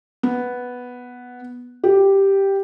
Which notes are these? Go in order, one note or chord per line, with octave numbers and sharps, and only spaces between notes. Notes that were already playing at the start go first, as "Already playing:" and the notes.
B3
G4